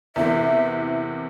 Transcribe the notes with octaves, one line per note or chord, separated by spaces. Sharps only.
E2 C3 E3 A#3 E5